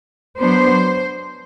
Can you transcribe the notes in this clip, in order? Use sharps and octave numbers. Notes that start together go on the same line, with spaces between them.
F#3 B3 D4 C5